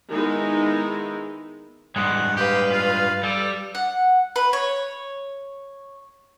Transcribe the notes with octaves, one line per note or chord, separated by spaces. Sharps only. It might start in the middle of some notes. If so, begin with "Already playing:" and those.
D#3 G#3 B3 D#4 E4
G2 G#3 F#5
G4 B4 F5
F4
G3 A4
F#5
B4
C#5